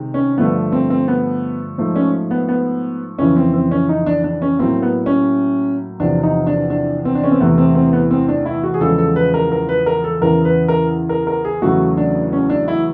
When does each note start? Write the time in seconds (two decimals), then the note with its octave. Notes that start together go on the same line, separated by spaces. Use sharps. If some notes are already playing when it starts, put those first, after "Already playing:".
Already playing: C3 D#3 G#3
0.14 C#4
0.38 G2 D3 F3 A3 B3
0.72 C4
0.90 C4
1.08 B3
1.78 G#2 F3 A3
1.96 C#4
2.31 B3
2.48 B3
3.19 F2 C#3 E3 C#4
3.36 C4
3.54 C4
3.71 C#4
3.89 D#4
4.06 D4
4.24 D4
4.42 C#4
4.59 A2 F#3 A#3 C4
4.82 B3
5.06 C#4
6.00 E2 C3 F3 D4
6.23 D#4
6.47 D4
6.70 D4
7.05 C4
7.15 D4
7.24 C#4
7.32 C4
7.40 E2 C3 E3 A3 B3
7.58 C4
7.75 C4
7.93 B3
8.11 C4
8.28 D4
8.46 E4
8.64 F#4
8.74 G#4
8.81 E2 C#3 F3 G#3 A4
8.98 A4
9.16 B4
9.34 A#4
9.52 A#4
9.69 B4
9.86 A#4
10.04 A4
10.21 E2 C#3 E3 A#4
10.45 B4
10.68 A#4
11.09 A#4
11.27 A#4
11.45 G#4
11.62 E2 C#3 F#3 A3 F#4
11.97 D4
12.33 C#4
12.50 D4
12.68 E4